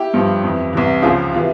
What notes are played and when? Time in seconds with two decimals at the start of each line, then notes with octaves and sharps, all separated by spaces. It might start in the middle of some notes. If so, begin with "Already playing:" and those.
Already playing: E4 G4
0.14 G2 F3
0.43 F2 E3
0.73 C2 C3 E3
1.02 C#2 C#3 F3 F4 G#4
1.33 C3 E3 F4